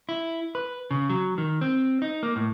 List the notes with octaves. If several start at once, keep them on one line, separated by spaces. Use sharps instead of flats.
E4
B4
C#3
F#3
D#3
C4
D#4
A#3
A2